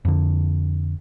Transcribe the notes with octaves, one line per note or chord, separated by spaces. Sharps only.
F2 D3